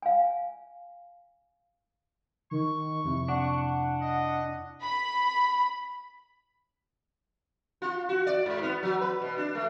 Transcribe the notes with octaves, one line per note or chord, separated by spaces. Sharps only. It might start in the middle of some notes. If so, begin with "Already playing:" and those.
F5 G#5
D#3 C#6
F2 C3 E4
D4 F#5
D#5
B5
F4
F#4
D5
G#2
B3
F#3
B4
B2
D4
A3